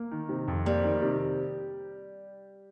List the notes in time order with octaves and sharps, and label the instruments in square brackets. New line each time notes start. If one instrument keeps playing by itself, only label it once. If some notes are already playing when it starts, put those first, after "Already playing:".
Already playing: [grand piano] A#3
D#3
C3
F2
[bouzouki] G3 [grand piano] A#3
[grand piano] D#3
C3